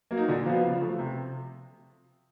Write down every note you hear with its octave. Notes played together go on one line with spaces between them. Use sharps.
F#3 A#3
D#4
A#2 D3 D4
F3 F#3 B3 F4
C#3
F3 A3
C3